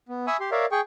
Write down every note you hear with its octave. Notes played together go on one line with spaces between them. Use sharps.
B3
E5 G#5 B5 C#6 D#6 E6
G4 C6
A#4 C#5 D5 E5 F5
G#4 G5 C#6